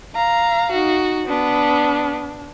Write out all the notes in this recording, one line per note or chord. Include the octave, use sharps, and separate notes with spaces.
F5 A#5
D#4 F#4
B3 D4